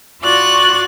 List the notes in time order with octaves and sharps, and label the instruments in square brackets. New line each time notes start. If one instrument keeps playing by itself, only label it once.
[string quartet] F4 F#4 D5 C#6 F#6 A6